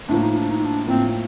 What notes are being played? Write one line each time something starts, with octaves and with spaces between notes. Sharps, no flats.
A2 F3 A#3 D4
D#4
D4
D#4
D4
A2 F3 A#3 C4